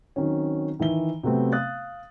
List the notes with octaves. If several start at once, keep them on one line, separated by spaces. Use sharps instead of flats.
D#3 F#3 C4 C#4
D#3 E3 E5 G7
C3 F#3 A3 B3 C4
F5 D#6 F#6 A6